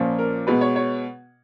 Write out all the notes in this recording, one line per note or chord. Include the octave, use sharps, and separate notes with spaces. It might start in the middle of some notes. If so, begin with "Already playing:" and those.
Already playing: A#2 F3 A#3 C#4
A#4
B2 G#3 B3 B4
C#5
C#5